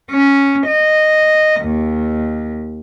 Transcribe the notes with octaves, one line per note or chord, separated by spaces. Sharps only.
C#4
D#5
D#2